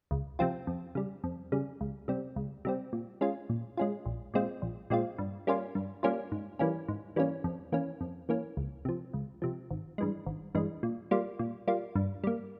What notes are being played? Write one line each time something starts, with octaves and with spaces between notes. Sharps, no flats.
C#2
C3 F3 C4 F4
F2
C#3 G3
F2
C#3 G3
C#2
C3 G3 C4
C#2
C3 G3 C4
A#2
G#3 C#4 F4
A#2
G#3 C#4 F4
A#1
A#2 G#3 C4 F4
A#1
A#2 G#3 C4 F4
G2
G3 A#3 C#4 F4
G2
G3 A#3 C#4 F4
G#2
E3 G3 A#3 C#4
G#2
E3 G3 A#3 C#4
F2
E3 A#3 C#4
F2
E3 A#3 C#4
C#2
C3 F3
C#2
C3 F3
G#1
G2 E3 G#3
G#1
G2 E3 G#3
A#2
G3 A#3 F4
A#2
G3 A#3 F4
G2
G3 A#3